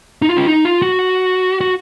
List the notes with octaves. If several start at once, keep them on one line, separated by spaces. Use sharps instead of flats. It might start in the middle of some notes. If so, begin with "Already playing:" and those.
D#4
F4
C#4
D#4
F4
F#4
F#4